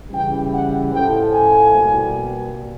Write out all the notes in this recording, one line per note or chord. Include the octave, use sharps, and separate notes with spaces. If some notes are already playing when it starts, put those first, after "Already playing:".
C#3 E3 G3 G5
F#5
A2 F3 A3 G5
G#5
B2 G3 A#3